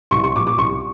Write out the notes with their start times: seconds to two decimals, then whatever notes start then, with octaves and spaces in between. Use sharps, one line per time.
0.11 C2 C#6
0.24 C#6
0.35 A#2 F3 D6
0.47 D6
0.58 C2 C#6